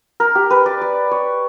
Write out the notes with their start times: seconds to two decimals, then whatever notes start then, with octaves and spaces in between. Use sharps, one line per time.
0.20 A#4
0.35 G4
0.50 B4
0.66 D5
0.81 D5
1.11 C#5